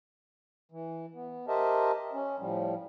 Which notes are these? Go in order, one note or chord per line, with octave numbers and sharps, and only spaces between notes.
E3
B3
G4 A#4 C5 D#5 E5 A5
C#4
A2 F3 G3